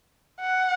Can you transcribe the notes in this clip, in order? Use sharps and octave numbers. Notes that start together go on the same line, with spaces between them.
F#5